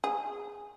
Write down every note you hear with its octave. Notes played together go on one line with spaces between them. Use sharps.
G#4